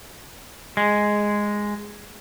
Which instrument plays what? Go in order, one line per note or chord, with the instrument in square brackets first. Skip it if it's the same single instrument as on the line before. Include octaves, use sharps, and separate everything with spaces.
[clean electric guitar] G#3